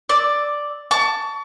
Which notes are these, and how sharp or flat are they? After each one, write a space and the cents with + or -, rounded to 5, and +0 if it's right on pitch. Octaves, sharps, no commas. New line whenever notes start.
D5 +0 E6 -20
A5 +5 C#6 +35